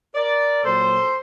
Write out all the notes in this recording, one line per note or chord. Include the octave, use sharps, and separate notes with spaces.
A#4 D5
A#2 F#3 A4 C5